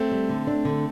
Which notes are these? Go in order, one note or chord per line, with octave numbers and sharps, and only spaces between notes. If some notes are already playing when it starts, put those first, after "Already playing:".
Already playing: A3 C4
G3
D3
D4
D3